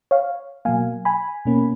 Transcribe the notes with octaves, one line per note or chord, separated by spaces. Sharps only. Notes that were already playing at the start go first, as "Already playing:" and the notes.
C#5 F5
B2 F#3 A#3 F5 G#5
G#5 B5
B2 A#3 C#4